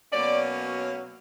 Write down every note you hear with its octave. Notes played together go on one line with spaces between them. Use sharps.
B2 F#3 A#3 C#4 D5